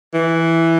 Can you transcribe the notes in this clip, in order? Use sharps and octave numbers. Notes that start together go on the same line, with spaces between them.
E3